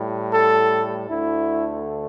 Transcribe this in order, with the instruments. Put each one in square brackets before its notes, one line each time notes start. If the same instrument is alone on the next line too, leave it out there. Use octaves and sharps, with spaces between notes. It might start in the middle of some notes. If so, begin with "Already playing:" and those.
Already playing: [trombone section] A2 G3
A4
D2 D3 A3 E4